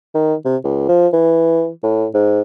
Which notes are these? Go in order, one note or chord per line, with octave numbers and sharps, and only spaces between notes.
D#3
C3
C#2
F3
E3
A2
G#2